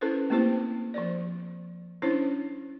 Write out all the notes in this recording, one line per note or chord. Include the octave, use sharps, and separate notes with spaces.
C#4 E4 A4 B4 C5
A3 A#3 C4 E4 G4 C5
F3 C5 D5
C#4 D4 E4 C5 C#5